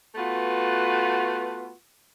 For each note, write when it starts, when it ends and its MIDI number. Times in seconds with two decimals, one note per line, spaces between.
0.15 1.71 57
0.15 1.71 59
0.15 1.71 65
0.15 1.71 66
0.15 1.71 71